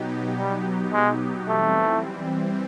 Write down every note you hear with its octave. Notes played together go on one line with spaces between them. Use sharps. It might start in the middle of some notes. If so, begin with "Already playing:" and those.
Already playing: B2 F#3 B3 D#4 G4
G3
G#3
E3 G3 A3 C4